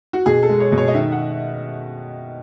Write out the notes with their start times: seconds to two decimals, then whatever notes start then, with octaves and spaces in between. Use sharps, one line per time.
0.13 F#4
0.26 B2 G#4
0.43 A4
0.49 G#3
0.60 C#5
0.72 B2
0.78 C#5
0.88 D#5
0.94 D#3 E5
1.12 F#5